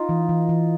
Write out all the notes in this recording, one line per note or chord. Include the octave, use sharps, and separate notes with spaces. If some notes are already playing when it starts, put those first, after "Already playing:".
Already playing: D#4 F4
E3
E3
E3